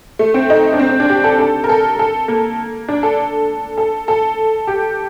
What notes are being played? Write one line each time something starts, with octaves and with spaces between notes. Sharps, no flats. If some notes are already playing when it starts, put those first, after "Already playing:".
A3
C4
D#4
D4
C4
C4
D4
G4
A4
A4
A#4
A4
A4
A#3
D4
A4
A4
A4
G4